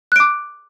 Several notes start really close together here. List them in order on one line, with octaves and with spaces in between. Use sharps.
F#6 D7 D6